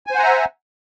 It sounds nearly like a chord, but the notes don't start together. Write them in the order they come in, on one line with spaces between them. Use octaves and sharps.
G#5 C5 F#5 A#5 E5